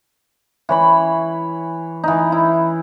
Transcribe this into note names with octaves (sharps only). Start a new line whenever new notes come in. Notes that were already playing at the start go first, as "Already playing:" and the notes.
E3 C#5 B5
E3 D#4
E4